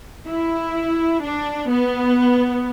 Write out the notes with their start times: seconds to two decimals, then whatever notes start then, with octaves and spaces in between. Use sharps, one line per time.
0.28 E4
1.22 D4
1.69 B3